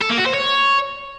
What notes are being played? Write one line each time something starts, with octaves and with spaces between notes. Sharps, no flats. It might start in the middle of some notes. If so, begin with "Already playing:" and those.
A4
A#3
F#4
C5
C#5